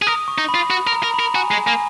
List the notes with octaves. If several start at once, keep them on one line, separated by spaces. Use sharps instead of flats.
G#4
A#4 D#6
C#6
D#4
B5
F4
F#4 B5
A#4
A#5
A#4
B5
A#4
F#4 G#5
G#3
A#3 G#5